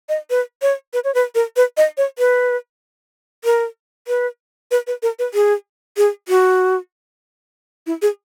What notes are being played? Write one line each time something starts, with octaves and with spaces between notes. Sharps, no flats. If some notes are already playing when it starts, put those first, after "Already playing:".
D#5
B4
C#5
B4
C#5
B4
A#4
B4
D#5
C#5
B4
A#4
B4
B4
B4
A#4
B4
G#4
G#4
F#4
E4
G#4